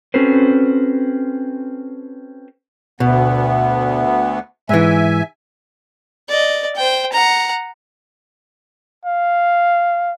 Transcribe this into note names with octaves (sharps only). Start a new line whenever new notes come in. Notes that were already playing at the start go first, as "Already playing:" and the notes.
C4 C#4 F#4 A4 B4 C5
D2 B2 B3
G#2 E3 E5 G#5
D5 D#5
C5 G5
F#5 A#5
F5